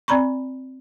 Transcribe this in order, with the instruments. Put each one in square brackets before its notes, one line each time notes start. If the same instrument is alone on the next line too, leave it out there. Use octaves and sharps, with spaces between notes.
[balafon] C4 D5 A#5 B5 C#6